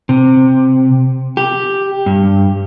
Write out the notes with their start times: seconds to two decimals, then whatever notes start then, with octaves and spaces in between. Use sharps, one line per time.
0.09 C3
1.37 G4
2.06 G2